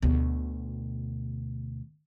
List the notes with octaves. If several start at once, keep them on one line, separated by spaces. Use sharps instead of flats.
D2 B2